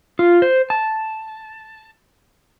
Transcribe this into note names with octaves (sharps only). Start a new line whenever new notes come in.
F4
C5
A5